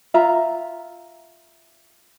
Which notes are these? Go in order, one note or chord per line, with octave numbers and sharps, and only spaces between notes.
F4 E5 A#5 B5